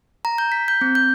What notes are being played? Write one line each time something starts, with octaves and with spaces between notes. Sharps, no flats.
A#5
G6
B6
G6
C4
G6